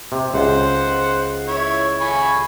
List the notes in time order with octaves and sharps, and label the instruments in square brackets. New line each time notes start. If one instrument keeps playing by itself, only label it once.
[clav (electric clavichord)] C3
[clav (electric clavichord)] C#2 [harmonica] C5 F#5
[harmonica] E4 C#5
G#5 B5 C#6